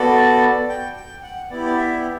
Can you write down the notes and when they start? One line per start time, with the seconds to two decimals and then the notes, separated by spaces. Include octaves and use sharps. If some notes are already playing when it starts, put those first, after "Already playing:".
Already playing: B3 F#4 A4 D5
0.69 G5
0.96 G5
1.23 F#5
1.50 B3 E4 G4 D5
1.66 D5
1.78 E5